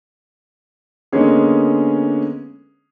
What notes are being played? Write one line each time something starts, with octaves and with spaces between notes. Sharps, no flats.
D3 G#3 A#3 B3 C#4 G#4